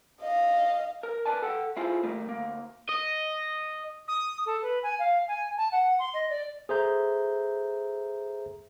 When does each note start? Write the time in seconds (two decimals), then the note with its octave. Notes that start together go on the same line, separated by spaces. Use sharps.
0.21 D#5 F5
1.03 A#4
1.26 B4 D5 G#5 A5
1.42 A4 F#5 G5
1.77 E4 F4 G#4 A4 C5
2.03 D#3 G3 A3 A#3
2.29 D2 A#3
2.89 D#5
4.08 D#6
4.45 A4
4.62 B4
4.83 G#5
4.99 F5
5.28 G#5
5.57 A5
5.72 F#5
5.99 C6
6.13 D#5
6.29 D5
6.69 G#4 A4 C5 E5 A#5 G6